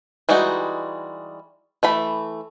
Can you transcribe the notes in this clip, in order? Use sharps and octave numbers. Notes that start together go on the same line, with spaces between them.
E3 G3 G#3 D#4 F#4
E3 A3 B5